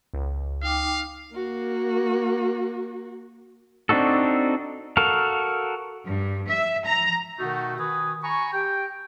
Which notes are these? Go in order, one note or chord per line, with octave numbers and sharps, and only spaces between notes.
C#2
D#4 F5 G5 D6
A#3 F#4
C4 D4 D#4 F#4 A4
F#4 A4 A#4 F5
G2
E5
A#5
B2 D#3 A3 D#4 F#4
D#3 F#4 B4 G#5 D#6
G#5 A#5 B5 C#6
G4 G5